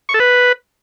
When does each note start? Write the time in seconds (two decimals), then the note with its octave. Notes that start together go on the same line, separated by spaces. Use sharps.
0.09 C#6
0.14 A4
0.20 B4